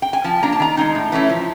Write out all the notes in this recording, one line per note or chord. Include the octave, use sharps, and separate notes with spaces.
G5
G#5
F3 A5
A#3 D4 A#5
A5
D#3 A#5
G#3 C4 D#4
A2
E3 A3 C#4 E4
F3